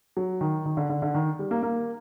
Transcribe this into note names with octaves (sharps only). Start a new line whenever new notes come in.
F#3
D#3
D#3
D3
D3
D3
D#3
G3
A#3
A#3